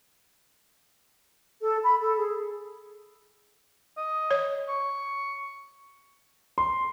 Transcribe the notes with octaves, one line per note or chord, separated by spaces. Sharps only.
A4
B5
A4
G#4
D#5
C#5
C#6
C6